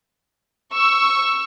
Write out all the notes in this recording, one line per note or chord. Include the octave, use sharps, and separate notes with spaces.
C#6 E6